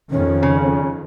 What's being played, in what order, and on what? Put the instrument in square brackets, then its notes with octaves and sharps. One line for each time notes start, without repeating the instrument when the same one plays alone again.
[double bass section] F2 D#3 [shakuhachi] C#4
[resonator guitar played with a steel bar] C#3